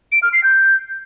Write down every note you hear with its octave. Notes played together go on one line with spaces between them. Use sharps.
D7
F6
C7
G6